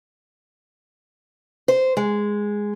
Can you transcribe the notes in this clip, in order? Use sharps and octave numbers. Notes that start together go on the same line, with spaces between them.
C5
G#3